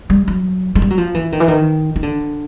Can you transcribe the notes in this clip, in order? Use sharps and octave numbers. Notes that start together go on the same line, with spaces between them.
G3
F#3
G#3
G3
F#3
F3
E3
D#3
E3
D#3
D#3
D3